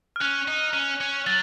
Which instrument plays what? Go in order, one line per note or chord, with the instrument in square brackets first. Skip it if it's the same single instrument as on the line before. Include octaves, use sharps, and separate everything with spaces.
[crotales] F6
[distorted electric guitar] C#4 [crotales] F#6
[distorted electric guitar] D#4
C#4
C#4
[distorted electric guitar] F#3 [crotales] A6